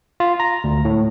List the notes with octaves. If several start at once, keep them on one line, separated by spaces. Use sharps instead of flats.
F4
A#5
D2
A2